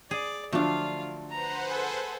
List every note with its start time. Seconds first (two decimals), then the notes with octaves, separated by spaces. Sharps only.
0.11 G#4 D5
0.52 D3 F3 F#3 A3 D4 F4 F5
1.31 B4 C5 F#5 A#5
1.68 G#4 A4